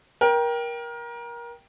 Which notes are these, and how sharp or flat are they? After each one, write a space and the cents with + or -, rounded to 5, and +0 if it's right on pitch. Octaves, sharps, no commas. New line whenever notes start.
A#4 +25 G5 +0